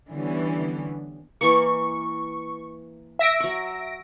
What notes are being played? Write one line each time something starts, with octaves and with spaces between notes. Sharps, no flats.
D3 E3 G3 B3 C#4
E3 A#3 C#6
E5 A#6 D7
F#3 C#6